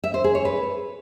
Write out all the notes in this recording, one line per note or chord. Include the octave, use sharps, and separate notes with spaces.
E5
C5
G#4
C#5
B4